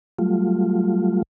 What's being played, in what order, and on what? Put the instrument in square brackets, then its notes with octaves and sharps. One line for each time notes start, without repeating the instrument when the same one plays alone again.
[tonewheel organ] F#3 G3 A3 F4